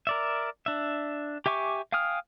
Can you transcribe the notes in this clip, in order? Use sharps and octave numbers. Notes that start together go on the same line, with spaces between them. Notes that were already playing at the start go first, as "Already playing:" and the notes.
A#4 D5 E5
D4 E5
G4 E5 G#5 C#6 D6
F5 G5 G#5 D#6 F6